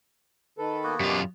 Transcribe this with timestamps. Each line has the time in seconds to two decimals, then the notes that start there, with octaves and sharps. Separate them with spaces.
0.58 D#3 A4 B4
0.84 A#3 B3 F#4
1.00 F#2 B2 F4 G4 D5